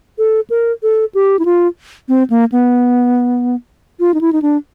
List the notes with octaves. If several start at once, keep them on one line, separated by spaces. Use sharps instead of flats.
A4
A#4
A4
G4
E4
F4
C4
A#3
B3
F4
D#4
E4
D#4
D4